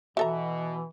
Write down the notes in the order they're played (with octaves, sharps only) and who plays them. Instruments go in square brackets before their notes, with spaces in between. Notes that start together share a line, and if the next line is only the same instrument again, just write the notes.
[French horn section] B2 [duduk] E3 [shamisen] F#4 A4 A#5 [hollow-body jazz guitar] E5